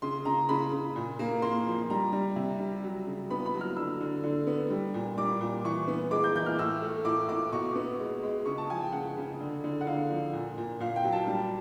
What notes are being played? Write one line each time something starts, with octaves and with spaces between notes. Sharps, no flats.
C#3 C6
C#3 A#5
C#3 B5
C#3
A#2
A#3
A#3 C6
F3
G3 A#5
G3
C3
G3
F#3
C#3
B3 B5
B5
F#3
F6
D3 E6
D3
D3
B3
G3
A#2
G3 D6
A#2
E3 C#6
B3
G#3 D6
G6
E3 G6
F6
A2 E6
A3
A2 D6
A2 D6
B2 C#6
B3
G#3
G#3
C#3 C#6
A5
F3 G#5
G5
C#3 F#5
C#3
D3
D3
F#5
D3 F5
F3
A#2
A#2
A#2 F5
G5
F#3
A5
G3